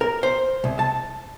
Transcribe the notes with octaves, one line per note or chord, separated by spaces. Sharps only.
A#4
C5
C2
A5